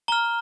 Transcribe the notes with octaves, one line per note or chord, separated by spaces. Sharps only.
A#5 F6 G7